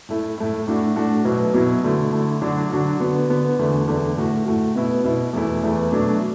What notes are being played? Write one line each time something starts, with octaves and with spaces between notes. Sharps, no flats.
A2 A3 E4
A2 A3 E4
A2 A3 D4 F#4
A2 A3 D4 F#4
B2 F#3 B3 E4
B2 F#3 B3 E4
D3 A3 E4
D3 A3 E4
D3 F#3 D4 F#4
D3 F#3 D4 F#4
D3 B3 F#4
D3 B3 F#4
E2 D3 A3
E2 D3 A3
A2 A3 F#4
A2 A3 F#4
B2 B3 E4
B2 B3 E4
E2 E3 A3 E4
E2 E3 A3 E4
B2 F#3 A3 D4